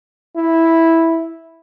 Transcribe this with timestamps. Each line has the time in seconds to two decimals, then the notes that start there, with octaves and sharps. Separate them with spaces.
0.37 E4